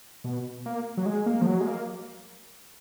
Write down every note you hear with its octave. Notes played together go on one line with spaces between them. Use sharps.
B2
A#3
F#3
G#3
A#3
F3
F#3
G#3
A#3